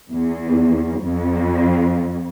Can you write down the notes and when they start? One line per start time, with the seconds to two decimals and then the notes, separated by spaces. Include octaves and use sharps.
0.11 E2
1.02 F2